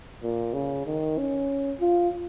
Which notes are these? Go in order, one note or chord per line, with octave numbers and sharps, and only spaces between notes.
A#2
C#3
D#3
C#4
F4